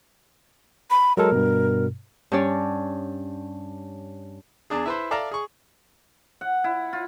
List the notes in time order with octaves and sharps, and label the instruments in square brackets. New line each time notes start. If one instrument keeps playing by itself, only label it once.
[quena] B5
[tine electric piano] F#3 G#3 A4 [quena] A#4
[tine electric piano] G2 B2
[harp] G2 C#4 C#5 D5
[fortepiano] E2 D4 G#4
E4 B4 C5
A4 D5 E5 F5 A5 A#5
G#4 C#6
[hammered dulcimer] F#5
E4
F4